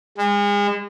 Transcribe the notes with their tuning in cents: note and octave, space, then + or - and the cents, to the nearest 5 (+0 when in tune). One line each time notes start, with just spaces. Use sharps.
G#3 -35